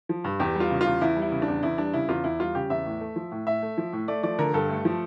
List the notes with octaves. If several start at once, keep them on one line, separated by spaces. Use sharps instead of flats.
F3
G2
E2 G4
G3 F4
C#3
F4
E2
E2 E4
G3
E4
C#3
D4
E2
E2 E4
G3 D4
C#3 E4
E2 F4
E2 E4
G3 F4
C#3 G4
E2 E5
A2
A3
F3
A2
A2 E5
A3
F3
A2
A3 D5
F3 D5
D3 A#4
G2 A4
A3
F3